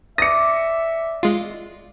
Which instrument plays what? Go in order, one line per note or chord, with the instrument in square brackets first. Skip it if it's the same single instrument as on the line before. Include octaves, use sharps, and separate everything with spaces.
[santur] D5 D6 [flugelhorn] E5 [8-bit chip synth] D#6 [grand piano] A#6 C#7
[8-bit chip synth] G#3 F4